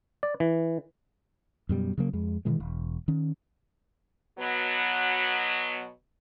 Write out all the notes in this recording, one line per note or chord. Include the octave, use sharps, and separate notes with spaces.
D5
E3
F#2 B2 G3
C#3 F#3 A#3
F2 G#3
B2 D#3 E3 G#3
E1
D#3 C#4
B2 F#3 B3